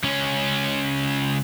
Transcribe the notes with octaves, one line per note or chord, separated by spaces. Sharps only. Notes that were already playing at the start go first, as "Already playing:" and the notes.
C#2 C#4